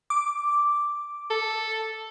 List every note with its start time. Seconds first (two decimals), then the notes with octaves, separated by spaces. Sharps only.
0.10 D6
1.30 A4